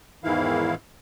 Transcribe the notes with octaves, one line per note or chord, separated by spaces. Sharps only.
E2 G#2 D#3 E3 E4 F5